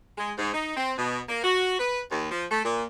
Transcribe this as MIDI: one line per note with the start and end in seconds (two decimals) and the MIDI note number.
0.18 0.32 56
0.38 0.54 44
0.54 0.76 63
0.77 0.93 60
0.98 1.20 47
1.29 1.43 58
1.44 1.77 66
1.79 2.02 71
2.12 2.30 39
2.31 2.46 53
2.51 2.62 57
2.65 2.85 46